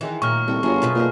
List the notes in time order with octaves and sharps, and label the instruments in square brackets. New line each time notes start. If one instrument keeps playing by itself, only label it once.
[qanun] D#3 G#3 D#4 [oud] E3
[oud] A#2 F#3 [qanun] G5 [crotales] C#6 F6
[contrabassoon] C2 [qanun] A4 G5
[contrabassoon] G1 [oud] F#2 [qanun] F#3 F4 G#4
[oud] F#2 B2 B4
[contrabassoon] A#2 [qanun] A3 D#4 G#4